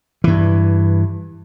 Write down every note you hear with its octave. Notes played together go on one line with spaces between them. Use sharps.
G2 E3